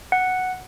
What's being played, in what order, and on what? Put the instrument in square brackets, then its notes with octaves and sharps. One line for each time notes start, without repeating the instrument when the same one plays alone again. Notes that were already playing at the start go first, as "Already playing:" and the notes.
[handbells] F#5